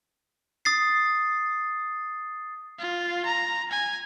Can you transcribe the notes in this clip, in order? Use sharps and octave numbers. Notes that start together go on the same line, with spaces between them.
D#6 A6 C7
F4
A#5
G#5